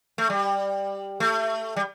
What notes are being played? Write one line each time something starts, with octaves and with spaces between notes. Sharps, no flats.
A3
G3
A3
G3